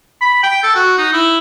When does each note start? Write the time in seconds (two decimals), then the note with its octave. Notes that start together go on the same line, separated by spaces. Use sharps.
0.21 B5
0.43 G5
0.64 A4
0.75 F#4
0.98 D#4
1.13 E4